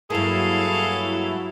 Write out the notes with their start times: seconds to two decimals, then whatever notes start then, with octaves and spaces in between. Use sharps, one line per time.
0.10 G2 F#3 A#3 E4 G#4 A4 F5